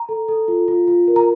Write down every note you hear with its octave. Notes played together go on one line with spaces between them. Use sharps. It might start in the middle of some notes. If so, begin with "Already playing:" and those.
Already playing: A#5
A4
A4
F4
F4
F4
A#4
A#5